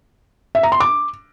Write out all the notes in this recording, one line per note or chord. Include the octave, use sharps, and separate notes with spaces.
E5
A#5
C6
D6